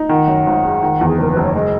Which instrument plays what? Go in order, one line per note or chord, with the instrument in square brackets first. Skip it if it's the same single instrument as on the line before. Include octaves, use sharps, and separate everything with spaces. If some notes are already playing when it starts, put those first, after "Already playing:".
Already playing: [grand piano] D#4
[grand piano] D#3 [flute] F#5
[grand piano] F#2
G#1
G#3
D#3
E2
[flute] G#4
[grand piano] F#1 [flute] A#4
[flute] B4
[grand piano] F#1
[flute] C#5
[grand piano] G#3 [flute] D#5